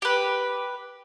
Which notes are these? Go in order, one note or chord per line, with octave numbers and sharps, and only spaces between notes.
G4 B4